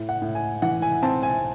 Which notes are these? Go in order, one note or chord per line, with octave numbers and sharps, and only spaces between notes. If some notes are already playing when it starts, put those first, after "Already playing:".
Already playing: A2
F#5
A2
G#5
E3 F#5
G#5
C4 A5
G#5